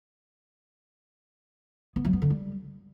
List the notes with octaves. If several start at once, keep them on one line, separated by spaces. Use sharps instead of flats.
B3
F#3
B3
D3
G3